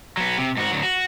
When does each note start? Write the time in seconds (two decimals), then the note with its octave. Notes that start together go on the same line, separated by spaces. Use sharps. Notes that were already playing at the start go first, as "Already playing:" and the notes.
0.17 F#3 B3
0.38 C3
0.57 G#2 F#4
0.71 D2 F#3
0.83 F#4